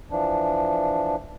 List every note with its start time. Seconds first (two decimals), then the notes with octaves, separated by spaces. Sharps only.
0.11 E3 F3 D4